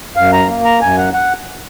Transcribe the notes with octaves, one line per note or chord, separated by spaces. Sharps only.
F#2 F5
A#5
A#3
A#5
F#2 G#5
F#5
F#5